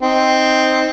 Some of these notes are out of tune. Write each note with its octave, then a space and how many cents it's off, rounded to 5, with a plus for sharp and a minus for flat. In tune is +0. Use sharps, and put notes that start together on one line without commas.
C4 +0 D#4 +0